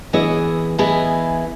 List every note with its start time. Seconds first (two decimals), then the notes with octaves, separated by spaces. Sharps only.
0.13 E3 B3 E4 G#4 D#5
0.78 E3 B3 E4 G#4 D#5